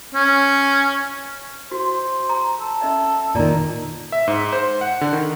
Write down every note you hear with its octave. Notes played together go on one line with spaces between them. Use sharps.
C#4
F#4 C5
A#5
A4
C#4 D#5 E5
A#2 D#3 D5 A#5
E5
G#2
C5
F#5
D3
D#3